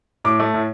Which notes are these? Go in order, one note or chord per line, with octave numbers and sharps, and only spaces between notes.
A2 D6
A3
A2